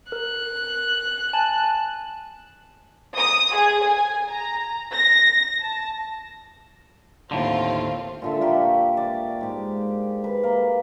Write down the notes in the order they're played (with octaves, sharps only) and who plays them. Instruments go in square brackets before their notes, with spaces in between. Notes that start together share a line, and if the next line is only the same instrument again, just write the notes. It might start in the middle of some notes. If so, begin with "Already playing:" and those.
[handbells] A#4 [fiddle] F#6
[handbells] G#5 A5
[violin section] D#6
G#4
G#5
A#5
A#6
A5
[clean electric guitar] D#2 A2 D3 [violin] C4 F4
[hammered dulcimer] A#2 D3 E5
A#3 G4 C#6
D5
G#2 G4
B4
A#3